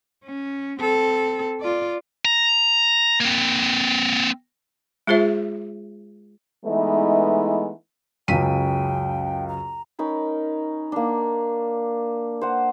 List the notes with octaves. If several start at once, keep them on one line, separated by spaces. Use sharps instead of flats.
C#4
C4 A4
F4 D5
A#5
A#3 C4
G#3 F4 G#4 C5 E5
E3 G#3 A3 B3 D#4 E4
C#2 F#2 C#3 G5 B6 D#7
A#5
C#4 D#4 A#4 B5
A#3 D4
C5 F#5